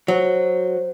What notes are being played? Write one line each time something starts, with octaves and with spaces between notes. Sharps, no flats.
F#3 C5